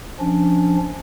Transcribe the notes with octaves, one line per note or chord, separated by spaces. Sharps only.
F3 C#4 D4